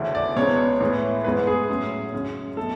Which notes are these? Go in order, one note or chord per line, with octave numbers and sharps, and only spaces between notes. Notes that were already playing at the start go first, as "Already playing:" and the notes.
Already playing: D2 C#3 E3 A3 C#4
D5
C#2 B2 G#3 B3 C#5
A2 E3 G#3 B3
G#2 G#3 B3 B4
G#4
A2 F#3 C#4
F#2 C#3 G#3 C#4
B2 A3 A4